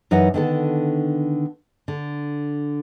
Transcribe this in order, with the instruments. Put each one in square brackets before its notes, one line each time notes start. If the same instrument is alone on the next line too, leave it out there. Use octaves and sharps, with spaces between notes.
[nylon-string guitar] F#2 E3 D#4 B4 F#5
D3 D#3 B3 A4
D3